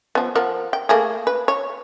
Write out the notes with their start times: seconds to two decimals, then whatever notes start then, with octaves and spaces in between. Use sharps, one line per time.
0.15 F3 B3
0.35 F3 A#4 F#5
0.73 G5
0.89 A3 A#3 G#4
1.27 B4
1.48 C#5